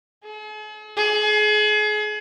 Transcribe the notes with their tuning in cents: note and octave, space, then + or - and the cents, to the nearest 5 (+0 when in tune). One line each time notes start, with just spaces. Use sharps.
G#4 +45
G#4 +35